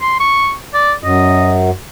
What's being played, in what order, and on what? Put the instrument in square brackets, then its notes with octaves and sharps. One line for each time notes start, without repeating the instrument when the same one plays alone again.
[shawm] C6
C#6
D5
[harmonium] F#2 [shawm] D#5